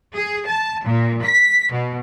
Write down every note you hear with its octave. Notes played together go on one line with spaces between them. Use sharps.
G#4
A5
A#2
B6
B2